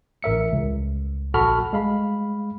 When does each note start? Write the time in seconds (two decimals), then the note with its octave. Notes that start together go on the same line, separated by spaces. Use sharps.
0.23 A1 A#4 E5 C#7
0.52 C#2
1.34 A#1 F#4 A4 A5 B5 F6
1.73 G#3 F5 B5